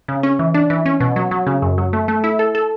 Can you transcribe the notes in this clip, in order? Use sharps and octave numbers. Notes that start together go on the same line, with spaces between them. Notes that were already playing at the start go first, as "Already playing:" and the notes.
C#3
C#4
E3
D4
E3
C#4
B2
F#3
F#3
C#3
F#2
F#3
A3
A3
E4
A4
A4